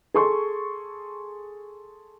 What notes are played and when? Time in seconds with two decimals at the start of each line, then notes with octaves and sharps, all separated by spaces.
0.14 G#4 A4 C6 C#6